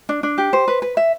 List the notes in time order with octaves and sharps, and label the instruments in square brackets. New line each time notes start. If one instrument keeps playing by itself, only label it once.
[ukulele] D4
D4
G4
C5
B4
B4
E5